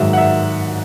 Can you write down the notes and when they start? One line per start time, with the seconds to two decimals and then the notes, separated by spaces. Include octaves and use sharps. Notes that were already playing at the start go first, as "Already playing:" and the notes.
Already playing: G#2 D#3 F#3 E5
0.13 F#5
0.17 E5